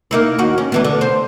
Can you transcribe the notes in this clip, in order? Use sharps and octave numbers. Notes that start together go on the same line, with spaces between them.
A#3 D#4 E4
D#2 D#4 F#4
C#4
D2 E3 B3
D3
C5